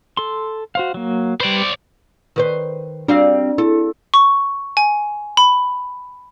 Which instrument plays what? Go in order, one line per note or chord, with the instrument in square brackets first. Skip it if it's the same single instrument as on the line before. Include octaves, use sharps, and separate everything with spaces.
[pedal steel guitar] A4 C6
F#4 C5 F5
F#3 A#3
[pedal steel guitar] G3 B4 [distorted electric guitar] C5 D5
[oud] D#3 B4 C5
[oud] G3 C4 F5 [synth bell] D4
[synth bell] E4 [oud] A4
[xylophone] C#6
G#5
B5